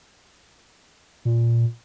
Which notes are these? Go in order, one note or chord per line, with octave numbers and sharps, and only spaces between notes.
A#2